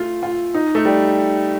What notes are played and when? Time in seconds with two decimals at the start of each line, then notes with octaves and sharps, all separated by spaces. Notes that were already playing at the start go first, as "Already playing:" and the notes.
Already playing: A3 F4
0.23 F4
0.54 D#4
0.75 A3
0.85 G3